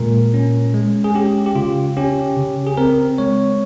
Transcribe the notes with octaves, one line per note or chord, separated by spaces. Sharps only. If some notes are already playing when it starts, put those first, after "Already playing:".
Already playing: A#2 G#3 A#4
C#4
G#3
G#4
C#4 G4
G4
C#3 F4
C#4 G4
C#3
G#4
C4 A#4
G#3 C#5